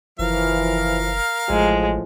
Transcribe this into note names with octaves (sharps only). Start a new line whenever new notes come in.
F#1 E3 F3 A#4 F5
A1 A2 F3 G#3